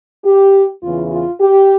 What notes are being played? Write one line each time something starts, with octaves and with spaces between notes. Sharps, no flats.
G4
E2 C#3 E3 F4
F4
G4